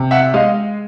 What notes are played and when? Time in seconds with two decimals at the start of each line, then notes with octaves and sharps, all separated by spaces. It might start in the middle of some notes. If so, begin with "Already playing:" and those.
Already playing: C3
0.11 E5 F#5
0.34 G#3 D#5 F5